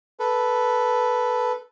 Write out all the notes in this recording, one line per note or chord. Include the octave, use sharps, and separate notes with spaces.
A4 B4